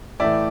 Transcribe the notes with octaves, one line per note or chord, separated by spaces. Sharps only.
A2 E3 A3 D5 E5